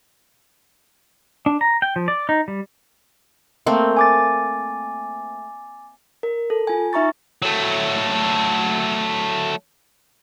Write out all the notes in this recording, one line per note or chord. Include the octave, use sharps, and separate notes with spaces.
D4
A#5
G5
F3
D5
D#4
G3
A3 A#3 C4
G#5 D6 A6
A#4
A4
F4 G#5
D#4 E5 A#5 C#6 A6
F#3 A3